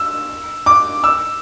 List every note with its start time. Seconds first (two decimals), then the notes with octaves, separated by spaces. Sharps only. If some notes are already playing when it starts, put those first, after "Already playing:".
Already playing: E6
0.66 D6
1.04 E6